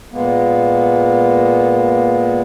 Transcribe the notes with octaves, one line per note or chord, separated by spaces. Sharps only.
A#2 G#3 A#3 B3